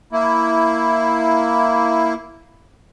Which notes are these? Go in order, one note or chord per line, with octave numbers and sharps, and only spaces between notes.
A#3 E4